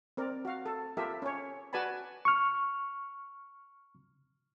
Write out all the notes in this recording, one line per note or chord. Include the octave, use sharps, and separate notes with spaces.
C4 A#4 D5
F#4 F5
A4
F4 G4 A4 A#4 E5
C#4 C#5
F#4 B4 D5 G#5 A5 B5
C#6 F6